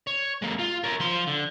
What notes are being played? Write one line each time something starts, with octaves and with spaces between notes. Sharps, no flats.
C#5
G#3 A#3
F4
A#4 C#5
F3 C6
D3